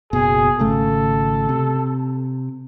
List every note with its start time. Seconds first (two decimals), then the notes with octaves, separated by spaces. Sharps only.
0.13 F#1 B2 G#4
0.59 G#1 C#3 A3 A4
1.49 C3